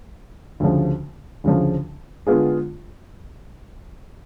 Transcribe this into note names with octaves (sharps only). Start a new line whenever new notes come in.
D2 C#3 F3
D2 C#3 F3
D3 G#3 B3 F4 G#4